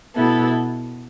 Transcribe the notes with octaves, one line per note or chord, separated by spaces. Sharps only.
B2 B3 E4 A4